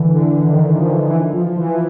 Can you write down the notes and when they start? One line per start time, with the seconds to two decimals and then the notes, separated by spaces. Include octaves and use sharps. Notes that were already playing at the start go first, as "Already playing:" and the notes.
Already playing: D3 E3
0.15 D3
0.47 D#3
0.78 F3
1.10 E3
1.33 F3
1.57 E3